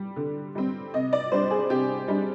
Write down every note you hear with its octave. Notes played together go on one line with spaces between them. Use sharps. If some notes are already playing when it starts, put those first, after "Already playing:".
Already playing: G3
D3
G3 C4
C3 D#5
D5
G3 D4 C5
G#4
C3 G4
G3 D4